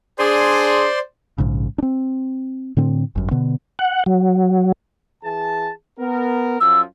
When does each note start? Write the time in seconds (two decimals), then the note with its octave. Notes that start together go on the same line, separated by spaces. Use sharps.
0.19 D4 G#4 C5 D5 C6
1.38 A#1 G#2 C#3
1.78 C4 D4
2.77 A2 D3 C4
3.15 G1 F#2
3.31 B2 D3 B3
3.79 F#5
4.06 F#3
5.23 E3 G#4 A5
5.99 B3 A#4
6.60 F#2 F3 E6